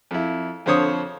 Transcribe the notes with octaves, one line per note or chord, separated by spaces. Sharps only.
F2 E4
F2 D3 C5 C#5 D#6